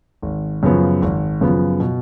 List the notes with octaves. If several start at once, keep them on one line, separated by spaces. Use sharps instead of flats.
G#1
F#2 C#3 F3 B3
G#1
F#2 C#3 F3 B3
B2